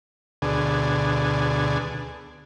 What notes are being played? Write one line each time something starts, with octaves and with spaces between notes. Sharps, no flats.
D2 B2 D3 G#4